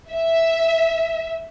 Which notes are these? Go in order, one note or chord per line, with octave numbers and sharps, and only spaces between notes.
E5